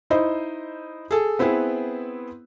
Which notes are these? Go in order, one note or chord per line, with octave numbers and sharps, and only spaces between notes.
D#4 E4 C5 D#5
G#4 A4
B3 C4 E4 G#4 B4